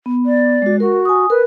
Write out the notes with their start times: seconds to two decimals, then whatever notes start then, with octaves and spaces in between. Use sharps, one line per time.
0.06 B3
0.26 D5
0.62 G#3 F#4
0.80 F#4 A#4
1.05 G#5 D#6
1.30 A#4 B4